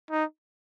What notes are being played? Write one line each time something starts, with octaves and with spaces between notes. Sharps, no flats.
D#4